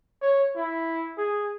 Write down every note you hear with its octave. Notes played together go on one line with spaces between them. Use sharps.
C#5
E4
G#4